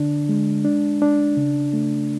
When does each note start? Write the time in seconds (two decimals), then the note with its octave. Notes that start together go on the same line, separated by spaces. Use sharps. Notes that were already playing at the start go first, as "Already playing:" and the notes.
Already playing: D3 D4
0.29 G#3
0.65 D4
1.02 D4
1.37 C#3
1.73 A3